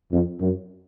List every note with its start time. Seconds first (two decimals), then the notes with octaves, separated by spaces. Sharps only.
0.12 F2
0.40 F#2